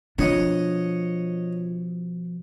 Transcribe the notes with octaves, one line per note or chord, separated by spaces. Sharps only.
B2 F3 D4 F4 C#5 D#5 F#5